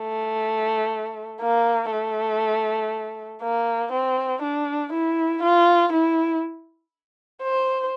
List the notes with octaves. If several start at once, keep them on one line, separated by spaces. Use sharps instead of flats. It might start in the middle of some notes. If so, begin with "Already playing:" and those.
Already playing: A3
A#3
A3
A#3
C4
D4
E4
F4
E4
C5